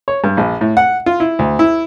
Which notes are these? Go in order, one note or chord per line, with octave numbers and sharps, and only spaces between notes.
C#5
G2
A#1
A2
F#5
F4
E4
D2
E4